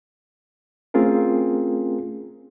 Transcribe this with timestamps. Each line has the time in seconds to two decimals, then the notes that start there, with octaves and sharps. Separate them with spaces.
0.94 A3 C4 C#4 F4 G#4 A#4